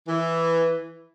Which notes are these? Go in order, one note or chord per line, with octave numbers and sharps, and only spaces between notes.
E3